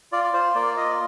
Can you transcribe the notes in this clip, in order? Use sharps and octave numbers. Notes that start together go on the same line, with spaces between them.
F4 D5
D5
F4 C5
A#3 D5
F4 D#5